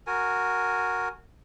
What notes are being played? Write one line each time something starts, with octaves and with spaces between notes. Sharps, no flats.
F#4 A#4 G#5